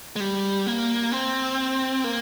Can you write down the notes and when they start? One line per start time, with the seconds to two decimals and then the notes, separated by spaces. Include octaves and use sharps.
0.16 G#3
0.20 G3
0.67 A#3
1.12 C4
2.04 A#3